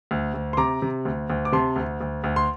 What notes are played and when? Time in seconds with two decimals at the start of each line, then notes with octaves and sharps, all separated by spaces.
0.11 D2
0.34 D2
0.53 C6
0.57 C3 A#5 D6
0.82 C3
1.05 D2
1.30 D2
1.45 D6
1.52 C3 A5 C6
1.76 D2
2.01 D2
2.24 D2
2.36 C6